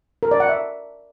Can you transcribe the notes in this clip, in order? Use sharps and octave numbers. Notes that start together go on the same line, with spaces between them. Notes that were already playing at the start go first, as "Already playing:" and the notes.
A#4
D5
F#5
E5